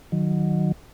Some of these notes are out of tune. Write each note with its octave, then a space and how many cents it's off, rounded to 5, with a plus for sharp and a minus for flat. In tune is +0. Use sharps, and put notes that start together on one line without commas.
D#3 -15 F#3 -10